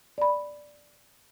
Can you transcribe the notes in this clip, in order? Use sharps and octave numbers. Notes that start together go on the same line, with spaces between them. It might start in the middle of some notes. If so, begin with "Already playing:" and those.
D5 B5